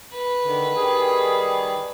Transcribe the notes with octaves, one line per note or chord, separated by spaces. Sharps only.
B4
D3 D#3
D#3 G3 G#4